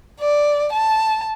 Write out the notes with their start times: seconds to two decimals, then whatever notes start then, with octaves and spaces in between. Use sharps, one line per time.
0.20 D5
0.72 A5